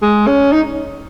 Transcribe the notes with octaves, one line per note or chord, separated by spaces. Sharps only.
G#3
C#4
D#4